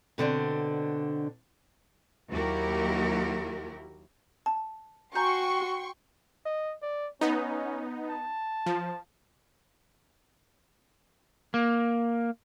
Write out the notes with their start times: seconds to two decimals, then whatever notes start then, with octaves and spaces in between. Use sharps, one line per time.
0.18 B2 D3 C4 D4
2.29 D#2 F#3 E4 F#4 G4 A#4
4.46 A5
5.15 F#4 G5 G#5 A#5 C6 C#6 G6
6.46 D#5
6.82 D5
7.21 B3 C#4 D#4
8.10 A5
8.66 F3
11.54 A#3